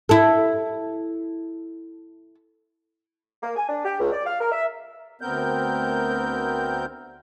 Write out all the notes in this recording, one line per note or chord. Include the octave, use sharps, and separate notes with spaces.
E4 A4
A#3
G#5
D4
G4
C#2
D5
F5
A#4
E5
D2 B3 C4 A#4 G6